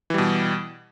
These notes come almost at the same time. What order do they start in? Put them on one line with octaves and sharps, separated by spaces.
E3 G3 B2